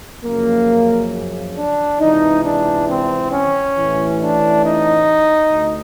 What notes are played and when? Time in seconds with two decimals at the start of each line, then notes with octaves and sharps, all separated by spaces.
0.24 F#2 C#3 F3 A#3
1.56 D4
2.00 C#2 C3 E3 D#4
2.44 D4
2.89 C4
3.32 C#4
3.77 A1 A2 E3
4.21 D4
4.64 D#4
5.52 D2